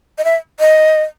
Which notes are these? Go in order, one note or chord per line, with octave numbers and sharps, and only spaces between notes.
D#5
E5
D#5